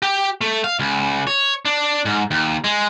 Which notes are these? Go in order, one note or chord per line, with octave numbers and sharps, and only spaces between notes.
G4
A3
F5
C#2
C#5
D4
G#2
D#2
G#3